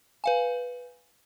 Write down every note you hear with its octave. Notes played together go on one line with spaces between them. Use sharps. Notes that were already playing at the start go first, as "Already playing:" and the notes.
B4 F5 G#5